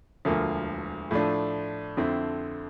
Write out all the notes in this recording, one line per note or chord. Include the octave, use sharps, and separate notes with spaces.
E1 D2 D3 F3 A#3
A2 F3 A3 D4
F2 D3 A3 C4 E4